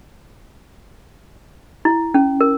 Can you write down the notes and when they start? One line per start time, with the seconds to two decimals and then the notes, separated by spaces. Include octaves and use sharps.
1.85 E4
2.14 C#4
2.41 A#4